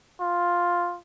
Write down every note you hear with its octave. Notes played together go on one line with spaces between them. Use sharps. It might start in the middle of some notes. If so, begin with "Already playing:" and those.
F4